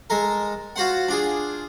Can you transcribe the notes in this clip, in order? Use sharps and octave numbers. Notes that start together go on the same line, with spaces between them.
G#3 A4 A#4
F4 F#4 C5 F#5
D4 F4 G#4